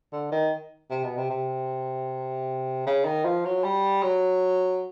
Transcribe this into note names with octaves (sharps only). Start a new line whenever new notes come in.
D3
D#3
C3
B2
C3
C3
C#3
D#3
F3
F#3
G3
F#3